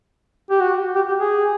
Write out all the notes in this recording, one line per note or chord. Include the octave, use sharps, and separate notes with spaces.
G4
F#4
G4
G4
G#4